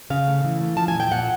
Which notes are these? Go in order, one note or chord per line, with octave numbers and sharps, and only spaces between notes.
C#3 F5
A3
E3
A3
F3 A5
G#5
A#2 G5
A#2 F#5